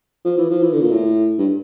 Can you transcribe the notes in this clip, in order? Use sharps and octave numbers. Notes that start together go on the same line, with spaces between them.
F3
E3
F3
E3
D3
A#2
A2
G2